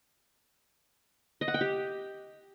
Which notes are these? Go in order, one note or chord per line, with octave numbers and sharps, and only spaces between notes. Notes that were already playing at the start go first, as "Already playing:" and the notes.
D#5
F#5
G5
G4